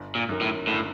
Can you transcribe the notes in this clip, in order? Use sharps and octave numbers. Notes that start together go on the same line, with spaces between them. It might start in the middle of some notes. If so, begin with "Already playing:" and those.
Already playing: G1
A#2
F#2 D#3
A2
G1 A2